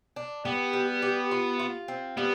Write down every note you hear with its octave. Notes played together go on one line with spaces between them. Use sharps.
D4
B3 G4
G3
G4
F4
F4
C4
G3 B3